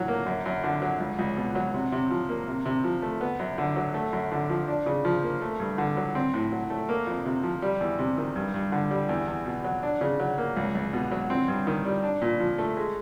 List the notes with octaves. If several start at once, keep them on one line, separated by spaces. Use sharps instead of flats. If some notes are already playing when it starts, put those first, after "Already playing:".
Already playing: A2 F#3
A#3
F#2
F#2
D3
F#3
C#2
C#2
B2
F#3
C3
C3
F3
A#3
C3
C3
F3
A3
B3
F#2
D3
F#3
A3
F#2
D3
F3
D4
C#3
F3
A#3
A3
G2
D3
F#3
C4
A2
F#3
A3
A#3
F2
C3
F3
G3
E2
C3
D#3
G2
G2
D3
G3
E2
E2
B2
F#3
D4
C#3
F#3
A#3
C#2
C#2
B2
F#3
C4
G2
D#3
G3
D4
A#2
F3
A3
G#3